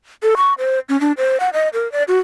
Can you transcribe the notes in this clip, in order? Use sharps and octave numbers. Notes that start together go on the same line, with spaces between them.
A4
C#6
C5
C#4
D4
C5
F#5
D#5
A#4
D5
F#4